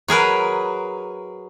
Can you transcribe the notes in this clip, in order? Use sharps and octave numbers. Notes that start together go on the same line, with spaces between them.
F#3 G#4 A#4 B4